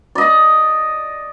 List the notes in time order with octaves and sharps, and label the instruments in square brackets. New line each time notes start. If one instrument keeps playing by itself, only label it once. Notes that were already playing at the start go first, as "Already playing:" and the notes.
[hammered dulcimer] D5 D#5